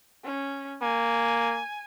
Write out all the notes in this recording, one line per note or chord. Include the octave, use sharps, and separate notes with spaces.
C#4
A#3 G#5